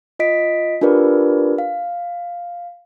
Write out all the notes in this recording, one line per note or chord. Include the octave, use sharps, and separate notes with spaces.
F4 D#5 B6 D7
D4 F4 G4 A#4 B4 D5
F5